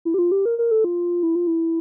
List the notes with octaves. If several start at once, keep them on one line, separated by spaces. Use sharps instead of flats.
E4
G4
F4
G4
A#4
A#4
A4
F4
E4
F4
E4